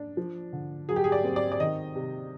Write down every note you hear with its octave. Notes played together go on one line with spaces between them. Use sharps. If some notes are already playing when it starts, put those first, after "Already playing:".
Already playing: D4
F3
D3
F#3 G#4
G4
G#4
D5
C4
D5
D5
D#3 D#5
C3